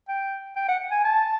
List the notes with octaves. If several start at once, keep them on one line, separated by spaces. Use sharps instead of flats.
G5
G5
F#5
G#5
A5